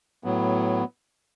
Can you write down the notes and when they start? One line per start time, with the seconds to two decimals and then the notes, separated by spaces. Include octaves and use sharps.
0.24 A2 F#3 B3